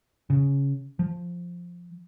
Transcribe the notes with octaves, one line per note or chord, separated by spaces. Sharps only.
C#3
F3